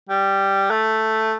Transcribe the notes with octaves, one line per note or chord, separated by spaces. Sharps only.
G3
A3